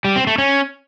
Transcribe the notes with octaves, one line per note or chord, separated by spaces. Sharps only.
G3
C4
A3
C#4